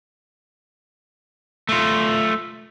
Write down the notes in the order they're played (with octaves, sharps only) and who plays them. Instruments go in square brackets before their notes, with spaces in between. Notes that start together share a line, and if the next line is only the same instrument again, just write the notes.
[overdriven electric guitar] A3 F4